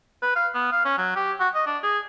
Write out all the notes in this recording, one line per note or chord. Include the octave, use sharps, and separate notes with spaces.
B4
F5
B3
F5
C#4
F#3
G4
F#4
D#5
D4
G#4